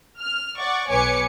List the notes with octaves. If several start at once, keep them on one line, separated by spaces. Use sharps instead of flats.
F6
D5 F#5 C#6
B1 B4 C#5 G#5 D6 C#7